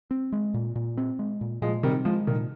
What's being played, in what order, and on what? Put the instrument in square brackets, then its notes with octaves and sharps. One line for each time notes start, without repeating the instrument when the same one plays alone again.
[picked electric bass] C4
G#3
A#2
A#2
C4
G#3
A#2
[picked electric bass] A#2 [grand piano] F3 G#3
[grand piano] D#3 G3 [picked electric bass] C4
[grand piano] F3 [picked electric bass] G#3
[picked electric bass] A#2 [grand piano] D#3